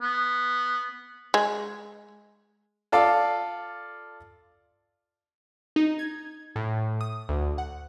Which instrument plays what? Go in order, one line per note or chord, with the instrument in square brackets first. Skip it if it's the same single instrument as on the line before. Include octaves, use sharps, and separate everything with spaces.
[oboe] B3
[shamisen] G#3
[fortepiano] F4 A4 D5 F5
[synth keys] D#4
G#6
A2
D#6
D2
F#5